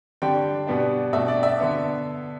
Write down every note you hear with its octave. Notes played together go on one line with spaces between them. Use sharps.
D3 G3 D4 G5
B2 G3 B3 D4
B2 A3 D4 E5
D5
E5
D3 B3 D4